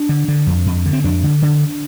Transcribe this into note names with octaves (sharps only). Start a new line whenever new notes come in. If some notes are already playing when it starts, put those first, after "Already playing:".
Already playing: D4
D3
D3
F2
F2
D3
C4
F2 D4
D3
D3